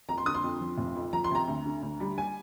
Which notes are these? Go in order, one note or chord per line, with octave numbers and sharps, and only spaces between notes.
F2 A#5
C6
D3 D#6
C6
F2
F3
F1
F2
F3 A#5
C6
C3 A#5
D2
D3
D2
G3
G#5